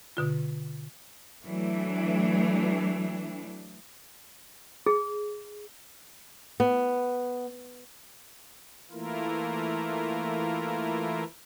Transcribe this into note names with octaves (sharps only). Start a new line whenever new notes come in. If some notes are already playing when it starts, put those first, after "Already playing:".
B2 D3 F4
E3 F#3 A3 D4
G#4
B3
E3 A3 A#3 E4 F4 A#4